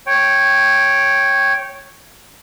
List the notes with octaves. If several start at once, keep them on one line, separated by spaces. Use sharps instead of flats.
C#5 G5